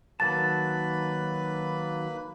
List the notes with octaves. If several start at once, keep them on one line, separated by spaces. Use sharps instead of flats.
D#3 F#3 A#3 B4 A5 B5 A6